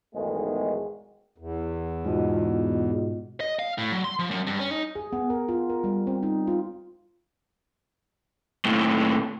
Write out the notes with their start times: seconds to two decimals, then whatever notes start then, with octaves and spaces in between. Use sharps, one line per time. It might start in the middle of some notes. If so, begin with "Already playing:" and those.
0.14 B1 E2 G#2 D#3 G#3 A3
1.38 E2
2.05 G#2 B2 F4 D#5
3.40 D#5
3.59 F5
3.78 A2
3.92 F#3
4.04 C6
4.19 F3
4.31 F#2
4.47 G2
4.60 C#4
4.71 D#4
4.96 G#4
5.12 B3
5.30 A#4
5.49 F4
5.70 A#4
5.84 G3
6.07 C4
6.23 D#4
6.47 F4
8.66 D#2 A2